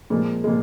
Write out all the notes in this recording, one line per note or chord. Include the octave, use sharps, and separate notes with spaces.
A#2 F3 G#3
A#2 F3 G#3